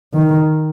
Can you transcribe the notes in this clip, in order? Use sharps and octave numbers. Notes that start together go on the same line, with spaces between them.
D#3